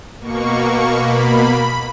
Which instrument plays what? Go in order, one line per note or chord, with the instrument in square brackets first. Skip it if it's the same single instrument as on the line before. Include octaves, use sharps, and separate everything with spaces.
[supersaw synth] B2 A#3 C#6
C#6
B5